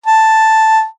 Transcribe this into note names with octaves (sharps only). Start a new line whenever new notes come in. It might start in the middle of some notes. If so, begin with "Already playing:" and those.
A5